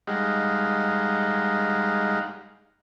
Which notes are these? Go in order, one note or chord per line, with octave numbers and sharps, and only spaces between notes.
G3 G#3 D#4 F5 F#5 A#5